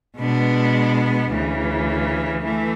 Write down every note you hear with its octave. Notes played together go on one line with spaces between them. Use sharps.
B2 G#3 B3 D4
D2 C#3 E3
E3 A3